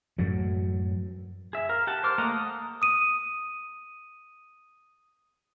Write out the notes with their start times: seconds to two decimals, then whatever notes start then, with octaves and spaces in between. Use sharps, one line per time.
0.18 F#2 A2 F#3
1.53 G#4 E5
1.69 A#4 F5
1.87 G4 F#5 A5
2.03 C5 D6 F6
2.18 A3 A#3 D#5 F#5 A#5
2.34 D#6
2.82 D#6 D#7